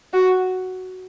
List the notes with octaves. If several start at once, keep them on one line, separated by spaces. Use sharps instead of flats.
F#4